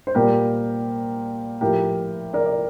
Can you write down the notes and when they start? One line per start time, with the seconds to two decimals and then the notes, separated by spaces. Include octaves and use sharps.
0.07 C5
0.15 A#2 G3 G4 A#4
1.61 A2 F3 G4 A#4
2.33 A#4 D5
2.46 D5